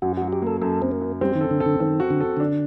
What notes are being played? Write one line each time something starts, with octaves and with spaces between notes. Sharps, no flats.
F#2 F#4
F#3 F#4
G4
A#3 A4
F#2 A4
F#2 C4
A#3
F#2
G3 C4
D#3
A4
D3
A4
D3
D#3 C4
F#4
D3
A4
D3 D4